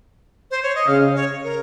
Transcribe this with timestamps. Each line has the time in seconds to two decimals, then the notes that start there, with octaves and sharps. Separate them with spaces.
0.51 C5
0.63 C#5
0.75 D#5
0.88 C#3 F5
1.16 C#5
1.44 A#4